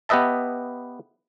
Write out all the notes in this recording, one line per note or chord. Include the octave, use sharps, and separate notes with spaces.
B3 G4 B4 D#5 E5 A5